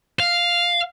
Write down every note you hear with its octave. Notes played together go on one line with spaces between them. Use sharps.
F5